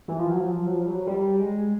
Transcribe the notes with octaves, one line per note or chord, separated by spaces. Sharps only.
E3
F3
F#3
F3
F#3
F3
G3
F#3
G3
G#3